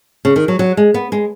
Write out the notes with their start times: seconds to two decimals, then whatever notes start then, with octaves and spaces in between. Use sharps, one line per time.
0.25 C#3
0.36 D#3
0.48 F#3
0.59 F#3
0.77 G#3
0.94 B3
1.12 G#3